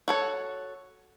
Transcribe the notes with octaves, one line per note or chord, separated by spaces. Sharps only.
F#4 A4 C#5